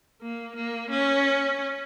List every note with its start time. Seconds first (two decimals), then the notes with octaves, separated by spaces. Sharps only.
0.22 A#3
0.55 A#3
0.90 C#4